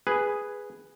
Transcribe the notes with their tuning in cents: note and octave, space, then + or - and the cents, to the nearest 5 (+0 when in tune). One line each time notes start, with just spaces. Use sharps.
G#4 -5 B4 +0